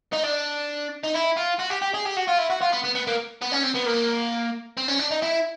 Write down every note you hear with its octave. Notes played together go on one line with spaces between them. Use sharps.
D#4
D4
D#4
E4
F4
F#4
G4
G4
G#4
G4
F#4
F4
E4
F#4
F4
B3
B3
B3
A#3
B3
C#4
C4
B3
A#3
C4
C#4
D4
D#4
E4